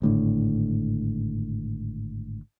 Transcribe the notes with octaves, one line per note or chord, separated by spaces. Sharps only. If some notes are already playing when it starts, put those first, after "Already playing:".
G#1 A2 D3